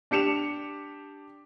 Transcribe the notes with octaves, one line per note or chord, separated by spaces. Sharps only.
D4 G4 C#7 E7 F7